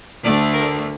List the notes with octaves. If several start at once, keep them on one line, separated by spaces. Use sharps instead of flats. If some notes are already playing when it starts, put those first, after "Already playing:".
D2 D3 A3 D5
A#4